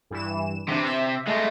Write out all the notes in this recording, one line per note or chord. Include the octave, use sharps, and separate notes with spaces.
G2 E3 E7
C3 E3 D4
E5
G#3 A3